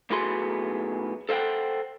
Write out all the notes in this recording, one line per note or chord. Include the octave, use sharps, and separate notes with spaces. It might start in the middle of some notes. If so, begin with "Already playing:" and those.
B1 A2 B3 F#4 G#4 C6
A4 C5 E5 F#5 G5